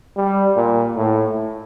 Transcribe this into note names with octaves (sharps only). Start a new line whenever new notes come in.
G3
A#2
A2